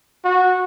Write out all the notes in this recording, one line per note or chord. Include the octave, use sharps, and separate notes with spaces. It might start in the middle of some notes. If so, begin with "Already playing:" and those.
F#4